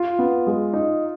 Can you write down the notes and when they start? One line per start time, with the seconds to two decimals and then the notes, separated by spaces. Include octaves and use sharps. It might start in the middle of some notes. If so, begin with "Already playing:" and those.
Already playing: F4
0.19 B3
0.47 G#3
0.73 D#4